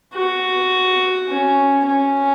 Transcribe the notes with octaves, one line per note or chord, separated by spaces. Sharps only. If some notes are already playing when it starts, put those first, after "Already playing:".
F#4
C#4
C#4